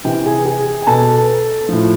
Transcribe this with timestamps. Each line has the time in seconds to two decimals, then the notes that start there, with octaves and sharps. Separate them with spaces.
0.04 C3 E3 G4 G5
0.26 G#4 G#5
0.46 G#4 G#5
0.82 G#5
0.87 B2 A4 A5
1.69 A2 F3